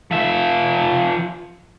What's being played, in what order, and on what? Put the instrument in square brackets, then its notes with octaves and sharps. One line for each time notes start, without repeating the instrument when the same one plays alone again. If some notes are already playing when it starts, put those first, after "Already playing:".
[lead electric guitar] F3 E5